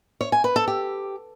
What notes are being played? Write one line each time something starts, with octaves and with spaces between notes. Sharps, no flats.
C#5
G#5
B4
A4
G4